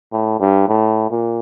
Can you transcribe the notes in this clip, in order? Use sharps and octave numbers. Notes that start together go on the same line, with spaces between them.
A2
G2
A2
A#2